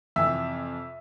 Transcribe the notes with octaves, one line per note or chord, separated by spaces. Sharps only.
F2 C3 E3 E5 E6